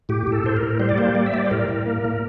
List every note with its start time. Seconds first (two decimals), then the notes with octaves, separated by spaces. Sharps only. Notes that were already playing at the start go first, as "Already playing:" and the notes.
0.09 A2 G4
0.27 A2
0.32 A4
0.44 A2 C5
0.56 A#4
0.62 A2
0.80 G3 C5
0.89 D5
0.98 A#3 C5
1.15 G3 D5
1.26 E5
1.34 G3 D5
1.46 C5
1.51 A2 A#4
1.68 A2
1.86 A#3
2.04 A2